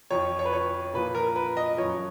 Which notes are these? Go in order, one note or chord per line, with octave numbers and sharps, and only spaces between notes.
F2 F3 C#5
C#5
B4
C#5
A#2 F3 B4
A#4
B4
D#5
F#2 F3 C#5